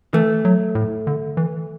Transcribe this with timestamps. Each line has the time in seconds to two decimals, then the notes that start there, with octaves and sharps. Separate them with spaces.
0.14 E3 A3
0.45 F#3
0.75 A2
1.07 D3
1.37 E3